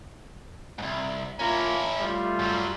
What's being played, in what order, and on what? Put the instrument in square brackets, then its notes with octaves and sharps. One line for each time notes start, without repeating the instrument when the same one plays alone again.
[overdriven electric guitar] C2 G#2
[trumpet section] A#3 F4 A#5 [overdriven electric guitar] C#4 E4
[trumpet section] G3 A3 F4
[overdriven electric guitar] F#2 F#3